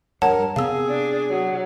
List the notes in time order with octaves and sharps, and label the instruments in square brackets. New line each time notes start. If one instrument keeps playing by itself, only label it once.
[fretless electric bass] G2 G3 [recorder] A#4 [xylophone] C#5 F#5 A5
[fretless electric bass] C3 B3 C4 [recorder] G#4 [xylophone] F5 E6
[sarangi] D4
F#3